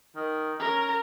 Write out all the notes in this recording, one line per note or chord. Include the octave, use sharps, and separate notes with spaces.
D#3
C#4 A#4